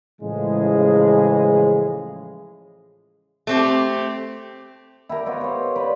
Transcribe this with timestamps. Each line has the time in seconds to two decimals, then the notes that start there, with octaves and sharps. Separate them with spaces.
0.22 A2 C#3 E3 F3 G#3 G#4
3.47 A3 C4 G4
5.09 E4 G4 A#4
5.26 B3 F4 C#5 D#5
5.41 C5 C#5
5.76 B4 D5